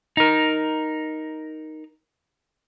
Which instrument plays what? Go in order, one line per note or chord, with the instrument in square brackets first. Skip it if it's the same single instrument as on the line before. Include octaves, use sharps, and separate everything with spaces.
[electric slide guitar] D#4 A#4